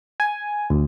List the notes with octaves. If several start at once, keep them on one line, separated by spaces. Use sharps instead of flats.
G#5
D2